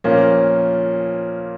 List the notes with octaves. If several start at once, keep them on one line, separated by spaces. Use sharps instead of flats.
A#2 F3 A#3 C#4